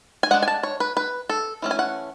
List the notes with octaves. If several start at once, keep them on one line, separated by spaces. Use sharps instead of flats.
G#5
G#3 D4 F#5
G#5
A5
C#5
B4
B4
A4
E3 A3 C#4
G#5
F#5